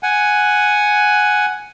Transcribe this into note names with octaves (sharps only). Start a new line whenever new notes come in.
F#5 G#5